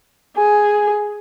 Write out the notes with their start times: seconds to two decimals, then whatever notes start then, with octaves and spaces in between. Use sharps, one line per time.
0.36 G#4 G#5